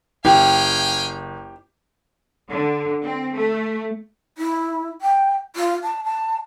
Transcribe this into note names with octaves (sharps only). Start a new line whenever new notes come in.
F#1 E4 G4 F5 G5 G#5
D3
C4
A3
E4
G5
F4
A5
A5